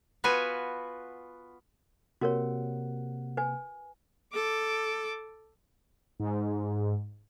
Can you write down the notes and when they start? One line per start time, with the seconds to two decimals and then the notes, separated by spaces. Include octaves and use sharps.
0.24 B3 F4 F#4 B4 G#5
2.21 C3 A#3 F#4 A#4 C#5 F#5
3.37 B4 G#5
4.33 A4 D6
6.20 G#2